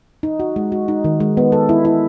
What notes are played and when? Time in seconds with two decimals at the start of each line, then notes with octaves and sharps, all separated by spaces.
0.23 D#4
0.40 F#4
0.56 G#3
0.72 F#4
0.88 D#4
1.04 D#3
1.20 G#3
1.37 B3
1.52 A4
1.69 E4
1.85 E4